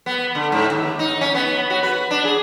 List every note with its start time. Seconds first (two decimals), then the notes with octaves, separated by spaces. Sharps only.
0.06 B3
0.35 D3
0.52 G#2
0.72 D#2
0.99 D#4
1.21 C#4
1.35 B3
1.70 F#4
1.83 B4
2.11 D4
2.25 G#4